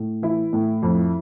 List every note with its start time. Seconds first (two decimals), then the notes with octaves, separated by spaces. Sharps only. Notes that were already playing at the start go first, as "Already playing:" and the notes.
Already playing: A2
0.22 E3 E4
0.53 A2
0.82 F2